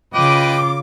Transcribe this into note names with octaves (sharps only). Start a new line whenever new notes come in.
C#3 F4 B4 D#5 G5 D6